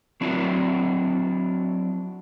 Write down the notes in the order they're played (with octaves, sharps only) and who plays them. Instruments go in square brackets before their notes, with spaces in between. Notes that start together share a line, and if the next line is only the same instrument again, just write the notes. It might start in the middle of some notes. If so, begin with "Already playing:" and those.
[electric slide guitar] F#3 C4 D4 E4 F#4